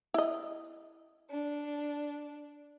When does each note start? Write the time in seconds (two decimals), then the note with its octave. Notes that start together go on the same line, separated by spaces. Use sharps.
0.14 E4 D#5
1.29 D4